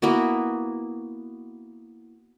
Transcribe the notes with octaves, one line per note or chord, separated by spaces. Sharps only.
A#3 B3 E4 F#4